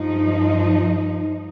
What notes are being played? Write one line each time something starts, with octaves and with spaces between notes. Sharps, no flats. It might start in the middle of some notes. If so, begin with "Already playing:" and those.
Already playing: G2 F3 D#4